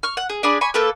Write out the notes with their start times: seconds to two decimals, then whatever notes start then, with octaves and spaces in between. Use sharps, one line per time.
0.03 C#6 F6
0.17 F#5
0.29 G#4
0.43 D4 G#4 D5 B5
0.61 G#5 B5 C#6
0.74 A3 A#3 A4 B4